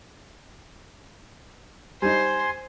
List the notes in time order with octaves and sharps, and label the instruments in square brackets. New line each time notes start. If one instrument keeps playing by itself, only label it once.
[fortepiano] G3 D#4 [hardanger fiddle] C5 [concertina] G#5 C6